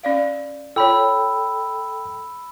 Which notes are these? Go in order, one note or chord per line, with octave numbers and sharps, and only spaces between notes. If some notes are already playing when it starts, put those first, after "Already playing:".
C#4 D5 F5
F4 A4 C#5 G5 B5 E6